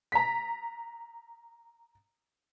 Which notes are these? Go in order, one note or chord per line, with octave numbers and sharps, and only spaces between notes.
A#5 B6